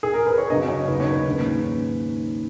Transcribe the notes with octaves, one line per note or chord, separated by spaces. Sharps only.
G#4
A#4
B4
C#5
F#2 C#3 F#3 D#5
C#5
D#2 C#3 F#3 B3 B4
C#5
B4
G#2 D#3 A#3 C#4